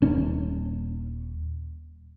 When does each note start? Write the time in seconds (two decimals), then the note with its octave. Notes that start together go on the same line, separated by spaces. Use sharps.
0.02 D#1 C#4